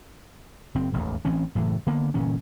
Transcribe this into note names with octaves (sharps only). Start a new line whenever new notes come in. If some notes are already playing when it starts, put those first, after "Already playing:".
F#1 C4
E1 A1 D#2
A1 E3 C4 C#4
F#1 A2 E3
D3 A#3 B3
G1 A#2 E3 C#4